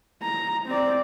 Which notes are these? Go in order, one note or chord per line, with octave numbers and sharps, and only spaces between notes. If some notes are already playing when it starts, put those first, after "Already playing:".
A#5
C4 D5